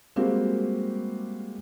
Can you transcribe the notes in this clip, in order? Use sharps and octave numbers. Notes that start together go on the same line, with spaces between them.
G3 G#3 A#3 C4 F#4 G4